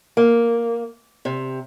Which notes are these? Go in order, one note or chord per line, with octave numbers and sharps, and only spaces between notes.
A#3
C3